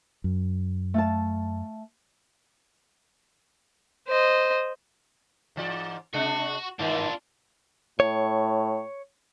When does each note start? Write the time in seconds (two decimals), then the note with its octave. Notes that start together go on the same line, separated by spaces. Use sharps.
0.24 F#2
0.94 A3 F5 A5
4.08 C5 D#5
5.56 G#2 E3 D5
6.14 C3 G#3 D4 F#4
6.79 G2 D#3 E3 D4 F4
8.00 A2 C#5